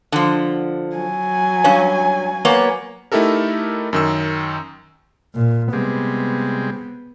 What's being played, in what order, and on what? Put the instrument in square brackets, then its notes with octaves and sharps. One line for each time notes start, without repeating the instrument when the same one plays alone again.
[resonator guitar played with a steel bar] D3 F3
[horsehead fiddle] F#3 G#5
[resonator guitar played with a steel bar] G2 C#4
A#3 B3 C#5
[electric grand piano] A3 D#4 E4 G4 A4 A#4
F#2 D#3 E6
[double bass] A#2
[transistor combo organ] C3 G3 G#3 [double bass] B3